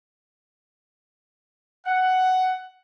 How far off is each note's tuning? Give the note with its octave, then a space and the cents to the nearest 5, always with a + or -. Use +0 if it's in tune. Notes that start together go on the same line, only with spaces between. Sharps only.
F#5 +10